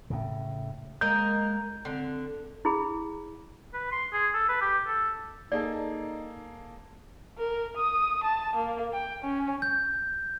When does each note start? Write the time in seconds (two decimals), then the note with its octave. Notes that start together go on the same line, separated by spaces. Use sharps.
0.10 A2 C#3
1.01 G#3 A#3 A#4 D#5 G6
1.85 D3 C4
2.65 E4 G#4 B5
3.74 B4
3.92 C6
4.13 G#4
4.34 A4
4.49 B4
4.61 G4
4.87 A4
5.52 A#3 D#4 G#4 A4 D5
7.38 A#4
7.76 D#6
8.23 A5
8.55 A#3
8.93 G5
9.22 C#4
9.62 G6